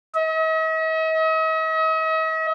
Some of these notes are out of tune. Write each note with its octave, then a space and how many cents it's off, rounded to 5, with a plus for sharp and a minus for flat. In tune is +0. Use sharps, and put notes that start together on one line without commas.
D#5 +45